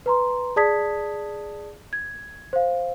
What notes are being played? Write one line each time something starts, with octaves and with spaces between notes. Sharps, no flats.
B4 A#5 C6
G#4 D5 A5 D#6 G#6 B6
G#6
C5 F5